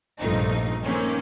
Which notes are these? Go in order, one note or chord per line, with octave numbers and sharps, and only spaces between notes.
A#1 G2 C3 F3 A3 D#4
D#3 A#3 C4 C#4